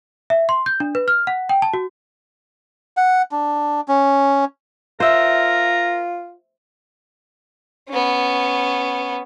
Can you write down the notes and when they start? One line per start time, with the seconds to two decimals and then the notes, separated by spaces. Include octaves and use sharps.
0.30 E5
0.49 C6
0.66 G6
0.80 D4
0.95 B4
1.08 F6
1.27 F#5
1.49 G5
1.62 A5
1.73 F#4
2.97 F#5
3.31 D4
3.88 C#4
5.00 F4 A#4 C5 E5
7.89 B3 C#4